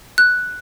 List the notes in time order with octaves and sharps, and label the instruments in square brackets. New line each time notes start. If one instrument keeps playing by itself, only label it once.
[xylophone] F#6